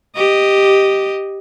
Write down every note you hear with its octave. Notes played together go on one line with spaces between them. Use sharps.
G4 D#5